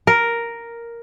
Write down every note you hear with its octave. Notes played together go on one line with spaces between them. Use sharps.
A#4